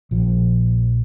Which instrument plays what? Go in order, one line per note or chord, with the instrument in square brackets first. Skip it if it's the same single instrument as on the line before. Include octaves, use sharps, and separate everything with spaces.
[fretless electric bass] A#1 F3